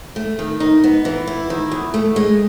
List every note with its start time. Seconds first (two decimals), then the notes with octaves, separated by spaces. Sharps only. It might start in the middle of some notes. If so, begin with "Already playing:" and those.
0.16 A3
0.39 D#3
0.60 D#4
0.84 B3
1.05 E3
1.27 E4
1.50 D#3
1.72 E2
1.94 A3
2.16 G#3